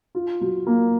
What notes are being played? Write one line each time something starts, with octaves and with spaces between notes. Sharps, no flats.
F4
F#3
A#3